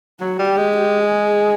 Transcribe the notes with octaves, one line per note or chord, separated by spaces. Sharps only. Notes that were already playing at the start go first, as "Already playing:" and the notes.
F#3 F#4
G3
G4
G#3
G4
G#4